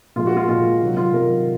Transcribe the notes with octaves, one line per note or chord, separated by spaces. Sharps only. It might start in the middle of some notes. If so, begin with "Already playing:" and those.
A#2 F3 G#3 F4
F#4
F4
A#2 F3 G#3 F4
C3 D#3 F#3
F4
C3 D#3 F#3 A#4